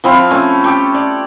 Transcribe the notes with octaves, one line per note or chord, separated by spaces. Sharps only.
F3 C4 E4 F4
A3 C#4
G4 A4
D5